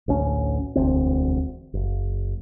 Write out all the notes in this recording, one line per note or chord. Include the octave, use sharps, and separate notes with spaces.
A1 D2 C#4
E1 D2 C4
F#1